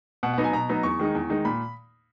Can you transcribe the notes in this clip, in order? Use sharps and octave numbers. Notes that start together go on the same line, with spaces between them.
B2 F#5
F#5
F#3 B3 D#4
G#5
B2 A#5
F#3 B3 D#4
E2 C#6
D#3 G#3 D#4
E2
D#3 G#3 D#4
A#2 B5